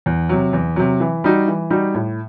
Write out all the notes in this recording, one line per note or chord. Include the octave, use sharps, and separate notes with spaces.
E2
C3 F#3
E2
C3 F#3
E3
G3 D#4 F#4
E3
G3 D#4 F#4
A2